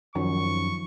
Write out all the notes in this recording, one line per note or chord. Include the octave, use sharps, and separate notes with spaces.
F#2 D#3 F3 F#3 D#4 C#6